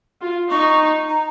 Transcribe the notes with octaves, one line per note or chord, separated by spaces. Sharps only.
F4
D#4 C#6
A#5